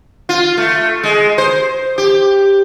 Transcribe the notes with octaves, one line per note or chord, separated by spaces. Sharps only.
F4
A3
G#3
C5
G4